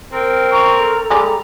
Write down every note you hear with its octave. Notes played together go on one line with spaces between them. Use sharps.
C4 A#4
A#5 C#6
A4
G3 G#3 D5 A#5